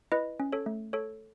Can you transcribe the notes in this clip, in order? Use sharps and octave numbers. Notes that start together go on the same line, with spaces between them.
E4 B4 D#5
C#4
A4 C#5
A3
A4 C#5